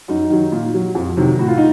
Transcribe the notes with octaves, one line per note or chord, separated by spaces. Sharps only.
F#2 D#4
D#3 F#3
A#2
F#3
F2
C3 D#3 F#3
A2 F#4
F4
D#4